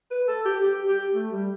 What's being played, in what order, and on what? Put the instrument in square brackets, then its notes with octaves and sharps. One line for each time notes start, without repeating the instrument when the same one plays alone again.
[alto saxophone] B4
A4
G4
G4
G4
A3
G3